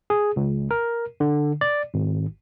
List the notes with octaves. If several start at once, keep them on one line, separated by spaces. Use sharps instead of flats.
G#4
C#2
A#4
D3
D5
G#1